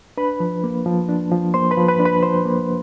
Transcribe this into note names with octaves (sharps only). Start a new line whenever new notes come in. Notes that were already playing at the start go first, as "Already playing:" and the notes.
D4 B4 B5
F3
A#3
F3
D4
F3
A#3 C5 C6
B4 B5
F3
B4 B5
D4
B4 B5
F3 C5 C6
A#3